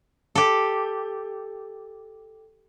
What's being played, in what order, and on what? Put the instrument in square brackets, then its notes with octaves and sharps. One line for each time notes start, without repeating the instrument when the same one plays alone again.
[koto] G4 A4